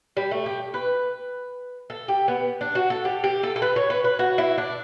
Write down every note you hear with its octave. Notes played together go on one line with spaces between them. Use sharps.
G3
A3
G4
B4
A4
G4
B3
D4
F#4
A4
G4
G4
A4
A4
B4
C#5
B4
B4
F#4
E4
D4